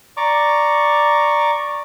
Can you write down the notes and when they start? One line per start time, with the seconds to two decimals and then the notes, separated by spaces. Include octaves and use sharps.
0.17 D5 A#5 C#6 D6